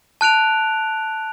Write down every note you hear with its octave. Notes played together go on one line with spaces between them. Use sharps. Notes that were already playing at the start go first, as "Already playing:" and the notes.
A5 F#6 D7 F7